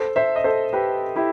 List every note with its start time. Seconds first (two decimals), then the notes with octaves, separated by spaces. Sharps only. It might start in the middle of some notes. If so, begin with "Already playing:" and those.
Already playing: A4 C5
0.16 C5 E5
0.36 D#5
0.44 A4 C5
0.73 G4 B4
1.16 E4 G4